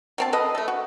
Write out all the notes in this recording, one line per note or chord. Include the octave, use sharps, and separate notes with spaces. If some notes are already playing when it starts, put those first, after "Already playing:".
F#3 C4 A5
A4 B4 D#5
A3 A4
F#4